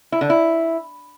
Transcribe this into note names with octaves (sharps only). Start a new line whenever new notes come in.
E4
D3
E4